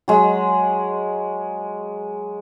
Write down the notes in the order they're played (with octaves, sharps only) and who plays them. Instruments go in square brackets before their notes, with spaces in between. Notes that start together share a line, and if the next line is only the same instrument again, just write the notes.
[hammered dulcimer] F#3 G#3